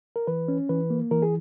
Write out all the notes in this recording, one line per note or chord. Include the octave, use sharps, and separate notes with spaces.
A#4
E3 B4
C#4
E3 B4
A#3
E3 A#4
G#4